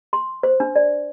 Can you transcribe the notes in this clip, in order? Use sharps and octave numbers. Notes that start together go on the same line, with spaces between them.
C6
C5
D4
D5